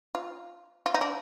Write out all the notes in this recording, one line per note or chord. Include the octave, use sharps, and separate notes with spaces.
F4
F4
D#4
D4